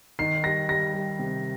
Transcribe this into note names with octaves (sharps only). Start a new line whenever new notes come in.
D#3 C7
G3 A#6
G3 A#6
G3
C3